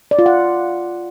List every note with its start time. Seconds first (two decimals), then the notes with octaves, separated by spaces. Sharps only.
0.11 D5
0.19 F4
0.26 F#5